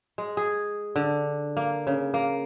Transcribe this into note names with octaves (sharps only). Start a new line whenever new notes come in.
G#3
G#4
D3
A#3
C#3
A#3